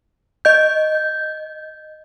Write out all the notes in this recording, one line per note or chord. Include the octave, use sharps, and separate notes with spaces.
D#5 G6